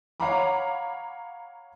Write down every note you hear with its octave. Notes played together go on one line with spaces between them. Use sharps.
C#5 F5 F#5 A#5 B5 D6